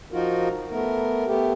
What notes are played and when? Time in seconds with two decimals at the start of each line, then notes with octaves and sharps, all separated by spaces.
0.12 F3 D#4 F4 F#4 A#4
0.71 A3 B3 A#4
1.26 A3 B3 G4